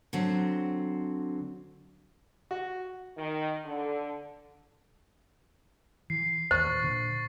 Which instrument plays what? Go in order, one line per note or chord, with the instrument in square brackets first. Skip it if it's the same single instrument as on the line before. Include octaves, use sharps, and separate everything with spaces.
[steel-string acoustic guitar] D3 F#3 C4
[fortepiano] F#4
[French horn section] D#3
D3
[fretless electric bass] E3 [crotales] C7
[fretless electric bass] A1 D#2 [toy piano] C5 [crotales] C#6 A6
[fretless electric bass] A#2 D3